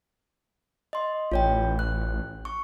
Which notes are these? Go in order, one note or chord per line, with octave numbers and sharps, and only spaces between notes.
D#5 C6
A1 F4 C#5 G5
F#6
C#6